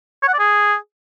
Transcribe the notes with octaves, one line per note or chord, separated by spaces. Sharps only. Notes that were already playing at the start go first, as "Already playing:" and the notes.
C#5
F#5
D5
G#4